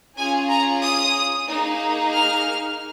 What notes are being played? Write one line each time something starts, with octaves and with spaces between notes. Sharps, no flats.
C#4 F4 G#4 G#5
A#5
D#6
A#3 D#4 G#4
F6